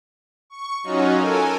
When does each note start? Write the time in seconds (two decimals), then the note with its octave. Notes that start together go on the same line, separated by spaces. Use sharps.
0.50 C#6
0.84 F#3 C#4 D#4 F4 F#4
1.17 A4 A#4 G#5